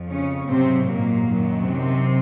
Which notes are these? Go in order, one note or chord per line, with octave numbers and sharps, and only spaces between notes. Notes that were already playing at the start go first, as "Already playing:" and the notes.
Already playing: F2 F3
C#3 C#4
G#2 C3 F#3 C4
A#2 A#3
F#2 D#3 F#3
C3 C4